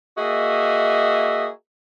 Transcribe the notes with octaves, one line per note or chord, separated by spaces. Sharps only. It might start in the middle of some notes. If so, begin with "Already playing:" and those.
A#3 F#4 G#4 D#5 E5